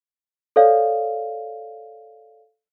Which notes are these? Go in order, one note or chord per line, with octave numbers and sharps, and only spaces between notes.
A4 C#5 D5 F5